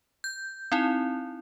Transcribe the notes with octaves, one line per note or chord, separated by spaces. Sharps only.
G6
C4 D#4 E4